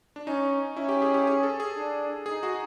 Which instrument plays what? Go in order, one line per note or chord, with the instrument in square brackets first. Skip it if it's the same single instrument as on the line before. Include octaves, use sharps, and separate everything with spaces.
[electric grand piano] D4
[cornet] C#4 [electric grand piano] D#4
[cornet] C#4 [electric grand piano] E4
[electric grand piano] G4
G#4
G4
G#4
A4
G#4
[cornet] D4
[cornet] D#4 [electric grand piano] G#4
[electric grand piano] F#4